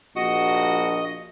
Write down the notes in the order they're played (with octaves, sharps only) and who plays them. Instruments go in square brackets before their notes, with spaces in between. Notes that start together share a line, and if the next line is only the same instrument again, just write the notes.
[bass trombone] A#1 [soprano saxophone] F#4 [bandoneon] D#5